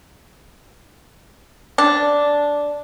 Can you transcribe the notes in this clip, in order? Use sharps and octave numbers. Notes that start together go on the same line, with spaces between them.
D4